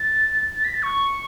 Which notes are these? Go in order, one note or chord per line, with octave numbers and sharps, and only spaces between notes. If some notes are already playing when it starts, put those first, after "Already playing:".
Already playing: A6
A6
B6
A6
C#6